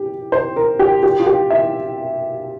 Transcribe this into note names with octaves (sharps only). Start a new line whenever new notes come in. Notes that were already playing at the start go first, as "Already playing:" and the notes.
Already playing: G4
C5
A#4
G4
G4
F4
G4
E5